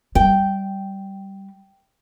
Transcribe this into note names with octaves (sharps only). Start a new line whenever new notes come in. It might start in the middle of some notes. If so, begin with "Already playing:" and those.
G3 G5